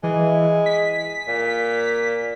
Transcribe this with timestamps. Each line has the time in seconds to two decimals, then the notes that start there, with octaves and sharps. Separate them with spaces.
0.03 E3 G#3
0.66 B6
1.28 A#2